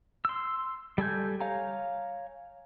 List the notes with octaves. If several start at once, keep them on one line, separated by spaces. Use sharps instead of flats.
C6 E6
G3 A4 G#5 G6
C#5 F5 G#5 A#5